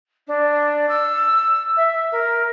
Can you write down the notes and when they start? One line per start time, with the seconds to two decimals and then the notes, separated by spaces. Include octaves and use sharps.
0.27 D4
0.89 E6
1.77 E5
2.12 A#4